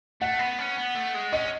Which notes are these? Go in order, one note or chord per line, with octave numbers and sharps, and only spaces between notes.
A3 F#5
B3
C#4
B3
A3
G#3
C#4 D#5